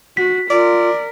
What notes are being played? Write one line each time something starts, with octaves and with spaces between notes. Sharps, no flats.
F#4 B6
F4 A#4 D5